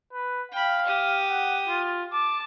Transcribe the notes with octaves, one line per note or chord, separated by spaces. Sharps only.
B4
F5 G5 B5
G4 D#6
F#5
F4
A5 D6